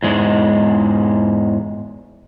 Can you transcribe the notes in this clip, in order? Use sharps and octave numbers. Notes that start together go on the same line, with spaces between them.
E2 G#2 G#3